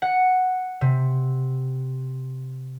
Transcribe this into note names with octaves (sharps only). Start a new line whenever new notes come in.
F#5
C3